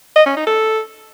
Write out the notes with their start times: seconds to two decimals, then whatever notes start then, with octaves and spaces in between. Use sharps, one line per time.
0.16 D#5
0.26 C#4
0.36 D#4
0.47 A4